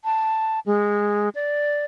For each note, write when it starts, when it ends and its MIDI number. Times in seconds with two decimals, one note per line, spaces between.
0.04 0.60 81
0.66 1.29 56
1.35 1.85 74